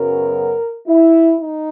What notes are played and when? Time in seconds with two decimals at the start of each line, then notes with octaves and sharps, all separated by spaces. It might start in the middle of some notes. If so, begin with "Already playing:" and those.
Already playing: F#2 C#3 F#3 B3 A#4
0.87 E4
1.41 D#4